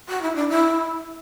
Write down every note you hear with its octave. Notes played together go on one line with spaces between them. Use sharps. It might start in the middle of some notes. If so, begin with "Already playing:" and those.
F#4
E4
D4
E4